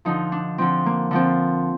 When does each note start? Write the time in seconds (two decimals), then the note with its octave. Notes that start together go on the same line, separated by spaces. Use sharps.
0.05 D3 F3 D#4
0.32 D4
0.58 D3 F3 C4
0.86 A#3
1.11 D3 F3 C4